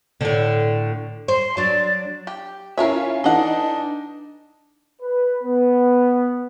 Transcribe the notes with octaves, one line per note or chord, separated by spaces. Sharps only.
A2 D3
C5 C6
F#3 D4 D5
G4
C#4 E4 F4 A#4 C#5 E5
E3 D4 D#4 A4 F#5
B4
B3